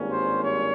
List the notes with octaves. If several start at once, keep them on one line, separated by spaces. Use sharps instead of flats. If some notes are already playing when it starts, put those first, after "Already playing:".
Already playing: G#1 G2 G3 A#3 C#4
C5
C#5